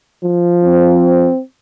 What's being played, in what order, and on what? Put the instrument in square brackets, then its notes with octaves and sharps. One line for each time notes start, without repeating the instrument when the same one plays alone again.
[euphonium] F3
[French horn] C4